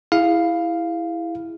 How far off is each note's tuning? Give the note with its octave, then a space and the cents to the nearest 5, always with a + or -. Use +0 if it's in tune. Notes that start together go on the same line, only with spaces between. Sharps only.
E4 +0 G#4 -20 F5 +0